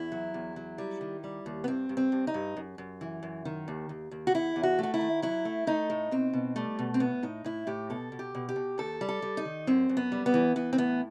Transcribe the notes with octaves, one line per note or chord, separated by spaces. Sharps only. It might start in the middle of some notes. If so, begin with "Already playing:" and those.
Already playing: E2 E4
F#3
E2
F#3
G3
D#3
G3
D#2
B3
G2 C4
G2
C4
G2
D#4
G2
F#2
F#2
E3
F#2
D#3
D#2
D#2
D#2
F#4
E2 E4
E2
F#4
A3 F#4
E4
D#3
F#3 E4
A3
A3 D#4
A2
B2 C4
B2
G3 A3
B2
C4
A2 B3
A2 D#4
A2 E4
A2 G4
B2 A4
B2
G4
B2
G4
B2
D#2 A4
G3
A4
G3
D#4
D#3
F#2 C4
F#2
B3
G3
B3
E3
E3 B3
C4
A2 B3